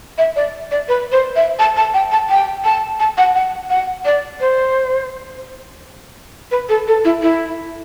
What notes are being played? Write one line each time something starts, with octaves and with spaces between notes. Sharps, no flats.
E5
D5
D5
B4
C5
E5
A5
A5
G5
A5
G5
A5
A5
F#5
F#5
F#5
D5
C5
B4
A4
A4
E4
E4